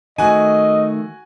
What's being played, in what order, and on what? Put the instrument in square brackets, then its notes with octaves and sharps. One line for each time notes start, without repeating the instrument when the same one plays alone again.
[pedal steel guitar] D#3 A3 [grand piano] F#4 G#5 [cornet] D#5